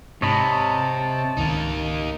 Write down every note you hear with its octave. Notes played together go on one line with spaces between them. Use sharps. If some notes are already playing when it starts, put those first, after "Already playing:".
G#2 C3 C#5 D#5 A5 B5
G#1 C#2 D#3 A#3 D#4